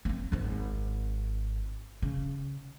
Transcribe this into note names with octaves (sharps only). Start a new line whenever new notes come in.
A#3 C4
G#1 C4
C#3